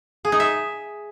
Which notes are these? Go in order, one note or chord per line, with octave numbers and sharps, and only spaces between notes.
G#4
D#4
E5